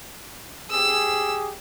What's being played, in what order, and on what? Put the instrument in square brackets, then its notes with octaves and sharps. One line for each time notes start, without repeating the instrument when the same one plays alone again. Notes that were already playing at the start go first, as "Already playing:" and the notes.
[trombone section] G4 G#4 [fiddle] E6